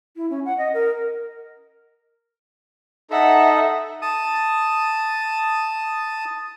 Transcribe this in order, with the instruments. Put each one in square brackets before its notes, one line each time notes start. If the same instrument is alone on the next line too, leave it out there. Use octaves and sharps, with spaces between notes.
[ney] E4
C#4
F#5
D#5
A#4
[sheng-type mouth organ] D#4 A4 [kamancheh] E5 F#5
[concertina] A5 D#6